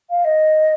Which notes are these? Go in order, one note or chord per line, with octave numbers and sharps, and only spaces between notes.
F5
D#5